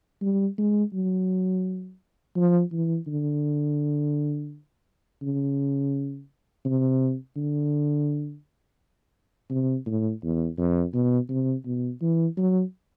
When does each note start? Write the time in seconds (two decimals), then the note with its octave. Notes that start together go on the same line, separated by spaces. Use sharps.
0.22 G3
0.58 G#3
0.93 F#3
2.36 F3
2.72 E3
3.08 D3
5.22 C#3
6.65 C3
7.36 D3
9.50 C3
9.86 A2
10.23 E2
10.58 F2
10.94 B2
11.29 C3
11.65 B2
12.01 E3
12.37 F#3